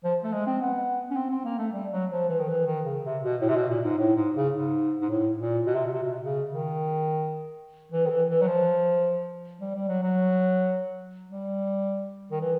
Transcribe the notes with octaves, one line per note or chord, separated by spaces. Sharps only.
F3
A3
G#3
C4
B3
C#4
C4
C4
A#3
A3
G3
F#3
F3
E3
D#3
E3
D#3
C#3
C3
B2
A2
C3
B2
A#2
G#2
A2
G#2
C#3
G#2
G#2
A2
A#2
B2
C3
B2
C3
B2
C#3
D#3
E3
D#3
E3
E3
F#3
F3
G3
G3
F#3
F#3
G3
D#3
E3